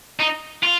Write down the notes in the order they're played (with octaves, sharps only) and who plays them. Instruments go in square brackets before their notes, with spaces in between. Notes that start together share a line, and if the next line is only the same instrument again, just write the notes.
[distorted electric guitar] D#4
F4